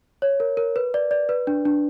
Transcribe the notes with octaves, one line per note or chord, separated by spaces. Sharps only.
C#5
A#4
A#4
B4
D5
D5
B4
D4
D4